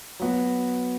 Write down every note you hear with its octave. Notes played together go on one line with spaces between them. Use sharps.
F#3 B3 F#4